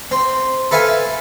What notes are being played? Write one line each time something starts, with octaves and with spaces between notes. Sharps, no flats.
C4
A4 B4 E5 F5 G#5